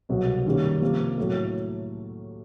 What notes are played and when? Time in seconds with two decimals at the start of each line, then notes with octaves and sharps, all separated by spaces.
0.09 C2 B2 F#3
0.46 F#2 D#3 G3 A#3 C#4
0.82 C3 F3 A#3
1.18 A2 F#3 A3